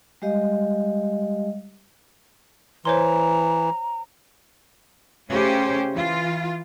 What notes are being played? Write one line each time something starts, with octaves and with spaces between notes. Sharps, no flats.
G3 G#3 G4 D#5 F5
E3 C5 C#5 A#5 C6
C#3 A3 C#4 G4 C5
E3 F4